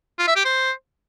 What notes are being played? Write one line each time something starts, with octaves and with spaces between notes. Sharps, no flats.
F4
E5
G4
C5